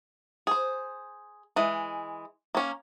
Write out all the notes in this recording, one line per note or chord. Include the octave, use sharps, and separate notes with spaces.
G#4 C5
E3 G#3
A#3 C#4